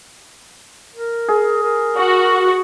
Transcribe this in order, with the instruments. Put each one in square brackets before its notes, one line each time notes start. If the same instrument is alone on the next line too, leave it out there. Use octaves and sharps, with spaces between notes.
[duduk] A#4
[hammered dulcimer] G#4
[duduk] A#4
[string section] F#4